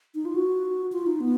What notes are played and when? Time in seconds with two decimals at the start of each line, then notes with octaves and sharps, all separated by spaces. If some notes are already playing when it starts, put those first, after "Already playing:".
0.15 D#4
0.25 F4
0.35 F#4
0.92 F4
1.06 D#4
1.21 B3